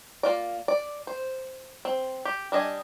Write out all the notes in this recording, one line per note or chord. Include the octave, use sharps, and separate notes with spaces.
A#3 F4 D5
D5
C5
C4
G4
G3 D4 D#5 G#5